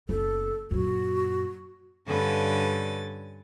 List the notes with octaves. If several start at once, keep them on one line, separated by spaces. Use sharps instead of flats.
F#1 B3 A4
F#2 A#2 F#4
G2 D3 C#4 A4 B4 A6